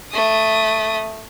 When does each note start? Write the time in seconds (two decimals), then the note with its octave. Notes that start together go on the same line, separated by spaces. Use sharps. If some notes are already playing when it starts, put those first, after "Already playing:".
0.12 A3 D#6